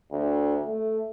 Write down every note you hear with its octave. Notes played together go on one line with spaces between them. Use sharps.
D2
A3